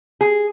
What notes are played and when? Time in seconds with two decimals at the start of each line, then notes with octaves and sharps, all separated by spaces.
0.21 G#4